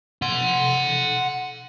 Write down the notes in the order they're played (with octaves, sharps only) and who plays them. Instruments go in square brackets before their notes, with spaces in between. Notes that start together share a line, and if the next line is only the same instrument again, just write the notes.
[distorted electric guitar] F#5 C6